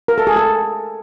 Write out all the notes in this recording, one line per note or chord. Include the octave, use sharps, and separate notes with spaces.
A#4
A4
G#4
A4